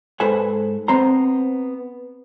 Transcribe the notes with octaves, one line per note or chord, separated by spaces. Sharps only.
G#2 A4 B4 C5 G#5
B3 C4 C5 A#5